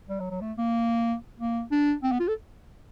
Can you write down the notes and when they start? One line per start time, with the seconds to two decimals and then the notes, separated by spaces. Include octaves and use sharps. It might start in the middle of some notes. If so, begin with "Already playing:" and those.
0.09 G3
0.20 F#3
0.31 F#3
0.41 A3
0.58 A#3
1.39 A#3
1.71 D4
2.04 C4
2.12 B3
2.20 F4
2.28 A4